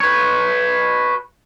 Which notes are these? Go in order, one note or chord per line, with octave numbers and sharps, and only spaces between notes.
B4 C#5